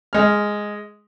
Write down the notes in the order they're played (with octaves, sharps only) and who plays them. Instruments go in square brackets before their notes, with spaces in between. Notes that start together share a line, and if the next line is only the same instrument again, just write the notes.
[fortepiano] G#3 F6